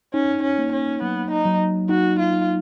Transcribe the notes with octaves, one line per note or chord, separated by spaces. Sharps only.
C#4 D#4
C#4
A#3
C#4
F#3 B3
D#4
F#3
D#4 F#4
F4
D#4